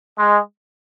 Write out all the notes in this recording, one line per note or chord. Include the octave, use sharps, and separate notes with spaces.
G#3